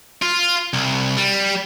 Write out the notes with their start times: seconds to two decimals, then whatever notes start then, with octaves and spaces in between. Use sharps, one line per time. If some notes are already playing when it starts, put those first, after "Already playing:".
0.22 F4
0.73 C2
1.17 G3